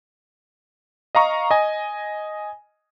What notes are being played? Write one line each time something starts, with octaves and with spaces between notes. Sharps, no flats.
D#5 F5 A#5 C#6
D#5 G#5